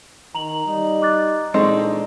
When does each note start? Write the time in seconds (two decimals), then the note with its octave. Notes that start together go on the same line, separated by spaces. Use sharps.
0.35 D#3 A#5 F7 F#7
0.65 G3 D#4
1.02 D6 F#6 A6
1.54 A#2 E3 G#3 C4 D4 D#4 A4 C#6